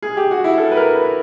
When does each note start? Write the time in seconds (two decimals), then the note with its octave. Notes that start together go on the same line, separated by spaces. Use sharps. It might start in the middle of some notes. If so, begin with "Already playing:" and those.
0.02 G#4
0.17 G4
0.31 F#4
0.44 E4
0.58 A4
0.71 B4
0.76 A#4
0.95 B4